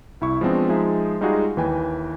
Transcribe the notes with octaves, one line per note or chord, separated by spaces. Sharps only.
C2 E4 C#6
F3 G#3 B3 C4 D4
F3 G#3 D#4 G#4 E5
G3 G#3 D#4 F4 F#4 G#4
D#2 E3 B4 G5 G#5